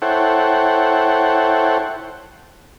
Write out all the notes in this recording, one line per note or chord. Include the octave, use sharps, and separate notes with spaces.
E4 A4 C5 C#5 F#5 G5